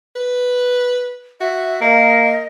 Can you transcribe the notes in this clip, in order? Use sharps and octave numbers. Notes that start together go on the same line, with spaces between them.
B4
F#4 E5
A#3 A#4 D#5